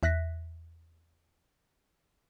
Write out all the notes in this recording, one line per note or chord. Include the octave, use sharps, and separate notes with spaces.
E2 E5 F#6 A#6 B6